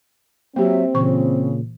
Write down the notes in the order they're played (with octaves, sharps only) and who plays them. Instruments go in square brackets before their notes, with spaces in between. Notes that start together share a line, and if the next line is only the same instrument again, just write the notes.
[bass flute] F#3 [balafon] A#3 G4 [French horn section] C4 [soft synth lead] E5
[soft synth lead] A#2 [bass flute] C#3 [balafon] E3 C#6